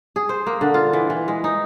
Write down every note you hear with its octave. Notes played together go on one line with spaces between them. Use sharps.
G#4
C5
A#3
D3
F4
E3
E3
G#3
D#4